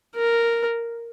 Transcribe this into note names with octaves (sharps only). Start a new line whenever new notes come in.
A#4